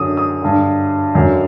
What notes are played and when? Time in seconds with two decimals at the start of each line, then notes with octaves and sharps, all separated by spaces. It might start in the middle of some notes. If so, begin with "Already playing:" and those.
Already playing: F#2 D3 D#6
0.17 D#6
0.42 G2 D3
1.15 F#2 D3